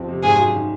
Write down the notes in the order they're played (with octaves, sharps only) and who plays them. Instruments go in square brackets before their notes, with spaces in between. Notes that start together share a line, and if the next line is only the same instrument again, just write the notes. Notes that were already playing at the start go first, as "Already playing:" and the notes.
Already playing: [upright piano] F2 C4
C3
[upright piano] G#1 [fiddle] G#4
[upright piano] F#2
D#3